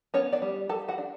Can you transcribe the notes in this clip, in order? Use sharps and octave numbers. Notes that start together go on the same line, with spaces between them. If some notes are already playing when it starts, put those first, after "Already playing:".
B3 C#4 C#5
D4 D5
G3
G3 A4 A5
F#4 F#5
D4